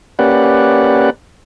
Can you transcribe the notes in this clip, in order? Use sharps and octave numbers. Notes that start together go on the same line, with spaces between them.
A#3 C#4 G4 B4 D5 F#5